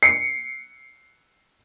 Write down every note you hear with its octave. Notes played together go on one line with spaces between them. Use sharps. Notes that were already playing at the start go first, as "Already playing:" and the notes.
C7 C#7